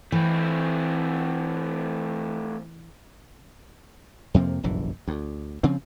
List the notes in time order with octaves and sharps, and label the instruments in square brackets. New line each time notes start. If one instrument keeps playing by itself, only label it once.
[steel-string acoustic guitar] E3 [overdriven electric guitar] A3 C4
[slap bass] F2 C3 F3 A#3
F1 A#1 F#2 E3
D2
C#3 F3 C4